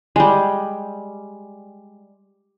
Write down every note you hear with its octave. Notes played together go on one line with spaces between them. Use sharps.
G3 G#3